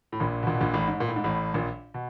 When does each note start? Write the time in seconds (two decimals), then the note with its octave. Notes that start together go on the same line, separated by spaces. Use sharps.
0.12 A2
0.20 A#1 A#2
0.43 B2
0.47 A#1 A#2
0.55 B2
0.61 A#1 A#2
0.74 A1 A2
0.87 G#2
1.00 A#2
1.09 A2
1.16 G#2
1.24 A1 A2
1.54 A#1 A#2
1.94 B2